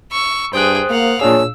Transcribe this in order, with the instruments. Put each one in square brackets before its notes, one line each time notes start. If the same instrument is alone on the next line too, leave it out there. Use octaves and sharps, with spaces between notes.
[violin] C#6 E6
[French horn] G2 [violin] G#4 G5 [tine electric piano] C5 D#6 F#6
[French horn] A#3 [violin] F5 F#5
[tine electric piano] A#2 D4 G#4 [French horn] C#5 [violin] E6